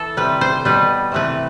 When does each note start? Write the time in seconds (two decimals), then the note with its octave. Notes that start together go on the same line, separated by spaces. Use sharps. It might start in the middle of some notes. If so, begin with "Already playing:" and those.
Already playing: E3 A4
0.17 C3 G3 B4
0.41 C5
0.65 B2 G3 B4
1.12 C3 E3 A3 B4